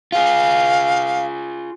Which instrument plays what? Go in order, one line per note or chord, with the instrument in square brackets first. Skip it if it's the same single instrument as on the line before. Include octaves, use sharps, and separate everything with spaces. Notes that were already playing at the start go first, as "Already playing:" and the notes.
[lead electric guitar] F4 G#4 [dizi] F5